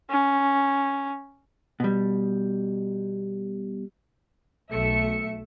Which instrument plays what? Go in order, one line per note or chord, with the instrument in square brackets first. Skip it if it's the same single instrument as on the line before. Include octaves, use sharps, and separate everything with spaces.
[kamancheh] C#4
[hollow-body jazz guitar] B2 G3
[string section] B1 A3 E5 C#7